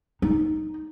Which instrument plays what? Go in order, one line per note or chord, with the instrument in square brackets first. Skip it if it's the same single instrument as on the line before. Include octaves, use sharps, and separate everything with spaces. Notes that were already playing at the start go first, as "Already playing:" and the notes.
[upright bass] D#4